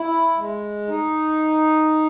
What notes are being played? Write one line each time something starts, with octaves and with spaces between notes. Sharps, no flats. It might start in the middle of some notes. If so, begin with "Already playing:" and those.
Already playing: E4
G#3
D#4